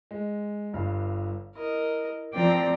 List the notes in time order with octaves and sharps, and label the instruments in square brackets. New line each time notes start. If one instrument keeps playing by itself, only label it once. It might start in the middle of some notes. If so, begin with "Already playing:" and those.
[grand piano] G#3
G1 G2 F5
[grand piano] E4 [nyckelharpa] A#4 D#5
[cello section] F3 C4 D5 [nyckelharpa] G5 A#5